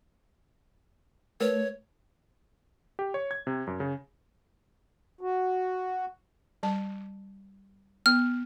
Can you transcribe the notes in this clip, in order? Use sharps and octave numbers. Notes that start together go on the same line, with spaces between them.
A3 A#4 B4 C#5
G4
C#5
G#6
C3
F#2
C#3
F#4
G3 A5
B3 F6